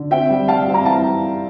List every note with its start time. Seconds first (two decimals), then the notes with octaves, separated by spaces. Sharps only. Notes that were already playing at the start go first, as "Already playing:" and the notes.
Already playing: D3
0.11 C4 E5 G5
0.30 G3
0.48 G3 F5 A5
0.67 C4
0.74 A#5
0.85 E3 F5 A5